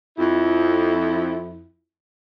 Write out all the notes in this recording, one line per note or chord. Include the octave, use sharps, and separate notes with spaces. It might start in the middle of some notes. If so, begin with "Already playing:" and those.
F2 E4